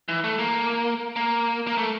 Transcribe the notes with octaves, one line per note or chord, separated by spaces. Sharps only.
E3
A3
A#3
A#3
A#3
A3